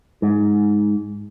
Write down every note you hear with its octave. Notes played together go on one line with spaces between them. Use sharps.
G#2